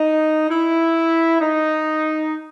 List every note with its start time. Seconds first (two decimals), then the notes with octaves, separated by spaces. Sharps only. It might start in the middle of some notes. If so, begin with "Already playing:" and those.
Already playing: D#4
0.49 E4
1.40 D#4